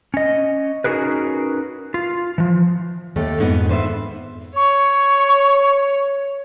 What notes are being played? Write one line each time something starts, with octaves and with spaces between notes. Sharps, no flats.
C#4 D#5
C#4 D#4 F#4 G#4 A#4 B4
F4
E3 F3
D#2 A3 G4 A4
F2 G#2 B3
B4 C5 D5 E5
C#5 C#6